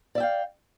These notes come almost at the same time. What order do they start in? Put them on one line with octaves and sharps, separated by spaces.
D5 E5 G5 F5